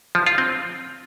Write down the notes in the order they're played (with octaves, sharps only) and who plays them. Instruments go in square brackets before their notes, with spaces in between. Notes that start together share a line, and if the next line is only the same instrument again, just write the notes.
[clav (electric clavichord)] F3
F4
C4